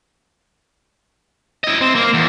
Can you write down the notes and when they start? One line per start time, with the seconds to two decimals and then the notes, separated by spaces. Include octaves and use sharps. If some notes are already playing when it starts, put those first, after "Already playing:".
1.64 E4 D#5
1.81 C4
1.95 A#3
2.14 E2